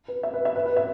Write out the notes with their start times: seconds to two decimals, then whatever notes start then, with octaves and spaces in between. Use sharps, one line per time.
0.08 B4
0.23 E5
0.34 B4
0.45 E5
0.56 B4
0.66 B4
0.77 E5